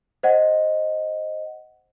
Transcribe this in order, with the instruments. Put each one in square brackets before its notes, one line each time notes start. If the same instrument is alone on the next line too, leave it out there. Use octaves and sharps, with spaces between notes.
[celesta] C5 D#5 F#5